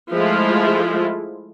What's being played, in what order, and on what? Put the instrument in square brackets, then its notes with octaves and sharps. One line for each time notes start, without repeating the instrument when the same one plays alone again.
[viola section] F3 G#3 A3 E4 F4